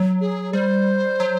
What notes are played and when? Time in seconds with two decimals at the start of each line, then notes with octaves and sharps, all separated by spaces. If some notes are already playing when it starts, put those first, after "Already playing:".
Already playing: F#3
0.21 G#4
0.53 G3 C5
1.20 F#3